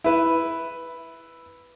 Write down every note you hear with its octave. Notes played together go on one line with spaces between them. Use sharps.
E4 B4